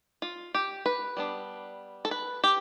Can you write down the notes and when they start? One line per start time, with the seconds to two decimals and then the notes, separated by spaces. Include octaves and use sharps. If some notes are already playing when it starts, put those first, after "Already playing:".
0.22 F4
0.54 G4
0.86 B4
1.17 G3 B3 D4
2.05 A4
2.11 B4
2.44 G4